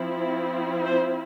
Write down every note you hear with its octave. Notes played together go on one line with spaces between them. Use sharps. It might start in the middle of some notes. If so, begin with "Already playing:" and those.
Already playing: F3 C4 E4
C5